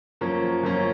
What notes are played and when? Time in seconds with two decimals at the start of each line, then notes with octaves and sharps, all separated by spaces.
0.21 F#2 F3 A#3 C#4
0.63 F#2 F3 A#3 C#4